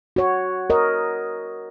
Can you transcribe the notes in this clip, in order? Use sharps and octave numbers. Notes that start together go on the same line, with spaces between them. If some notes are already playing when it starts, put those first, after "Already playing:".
F#4 C#5
A#4 C#5 D#5